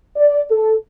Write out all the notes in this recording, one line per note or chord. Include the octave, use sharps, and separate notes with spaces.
D5
A4